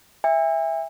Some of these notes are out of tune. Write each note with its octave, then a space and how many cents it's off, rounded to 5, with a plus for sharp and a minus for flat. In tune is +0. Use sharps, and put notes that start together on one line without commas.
E5 +0 G#5 -45